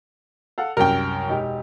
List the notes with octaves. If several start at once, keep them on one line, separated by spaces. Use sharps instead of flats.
A4 F5 F#5
C2 F#2 A#4 G5
E1 D#4 G4